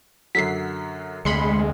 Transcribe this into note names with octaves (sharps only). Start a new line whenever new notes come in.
F#2 D3 F#3 B6 C7
F1 D2 G#3 B5 C6 C#7